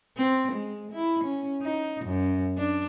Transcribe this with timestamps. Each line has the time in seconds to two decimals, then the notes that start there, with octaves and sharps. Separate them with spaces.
0.17 C4
0.52 G#3
0.92 E4
1.24 C#4
1.62 D#4
2.05 F#2
2.58 D4